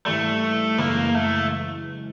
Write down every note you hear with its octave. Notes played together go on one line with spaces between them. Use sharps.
G#2 E3 G3 A3
F#2 C#3 E3 G#3 A#3
A3